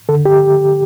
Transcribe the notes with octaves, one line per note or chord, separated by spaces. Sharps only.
D3 A4
G4